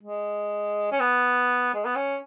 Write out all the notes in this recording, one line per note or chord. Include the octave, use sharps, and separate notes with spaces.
G#3
C#4
B3
G#3
B3
C#4